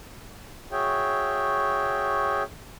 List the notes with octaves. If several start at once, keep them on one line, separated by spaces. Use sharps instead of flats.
F#4 G#4 C#5 E5 G5